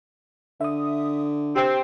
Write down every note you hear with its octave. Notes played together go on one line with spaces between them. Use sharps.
D3 E5 D#6
C4 G4 C7